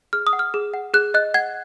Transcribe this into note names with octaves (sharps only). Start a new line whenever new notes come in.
G#4 F6
D#6
F#5
F6
G#4
F#5
G#4 F#6
D#5 F#6
F#5 G#6